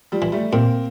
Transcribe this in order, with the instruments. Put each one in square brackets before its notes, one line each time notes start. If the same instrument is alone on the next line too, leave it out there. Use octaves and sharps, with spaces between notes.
[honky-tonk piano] F3 G3
[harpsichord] E3
[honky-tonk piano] G3 A3
[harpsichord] A#2 [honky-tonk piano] A#3 C4